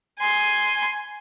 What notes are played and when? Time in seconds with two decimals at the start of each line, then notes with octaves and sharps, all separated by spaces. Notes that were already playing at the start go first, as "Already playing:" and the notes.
0.19 G#5 C6